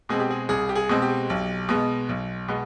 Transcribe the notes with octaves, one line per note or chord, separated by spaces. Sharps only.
B2 G#3 C4 G#4
G4
G#4
C2 G#4
G4
G#4
B2 G#3 C4
G4
B1
B2 G#3 B3
B1
B2 G#3 B3